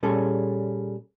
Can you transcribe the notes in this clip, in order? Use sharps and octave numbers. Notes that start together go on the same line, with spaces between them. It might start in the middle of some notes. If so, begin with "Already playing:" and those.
A#2 G3 C#4 G#4 A4